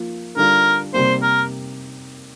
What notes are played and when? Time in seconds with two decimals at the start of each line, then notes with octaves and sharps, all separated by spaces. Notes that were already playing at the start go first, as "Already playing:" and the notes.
Already playing: F3 A#3 F4
0.36 D3 G3 D4 F4 A#4
0.94 C3 G3 A#3 C5
1.22 A#4